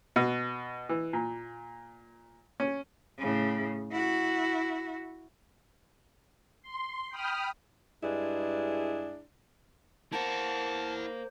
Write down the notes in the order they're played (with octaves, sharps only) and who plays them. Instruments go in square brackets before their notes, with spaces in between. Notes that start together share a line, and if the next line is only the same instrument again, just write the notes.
[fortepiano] B2
E3
A#2
C#4
[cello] A2 C#3
E4 F#4
[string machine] C6
G5 B5 D#6 F6
[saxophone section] G2 G#3 D4 E4 G#4
[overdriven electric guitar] A#3 A#4 [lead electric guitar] E4 F#5 [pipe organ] C5 [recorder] A5